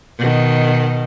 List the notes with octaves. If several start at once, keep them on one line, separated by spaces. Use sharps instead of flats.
B2 D#3